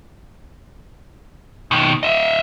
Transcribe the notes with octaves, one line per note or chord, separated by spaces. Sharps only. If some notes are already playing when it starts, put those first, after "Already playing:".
B2 D#3
D#5 E5